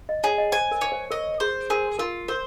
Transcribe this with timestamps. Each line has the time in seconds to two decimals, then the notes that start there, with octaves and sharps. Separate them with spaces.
0.09 D#5
0.24 G#4 C#5
0.38 D#5
0.52 C5 G#5
0.71 A#4
0.81 C#5
0.92 C5
1.11 A#4 D#5
1.40 G#4 C5
1.70 G#4 A#4
1.99 F4 A#4
2.28 A#4 C5